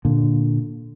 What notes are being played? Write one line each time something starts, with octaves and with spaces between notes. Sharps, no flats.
A#2 D3